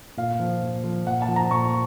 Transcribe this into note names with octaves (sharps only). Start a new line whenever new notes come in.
A#2 F5
F3
A#2
F3
A#2 F#5
A5
F3
A#5
A#2 C#6